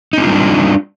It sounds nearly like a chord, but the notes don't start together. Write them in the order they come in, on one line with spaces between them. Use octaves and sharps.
D#4 C4 F4 G3 D4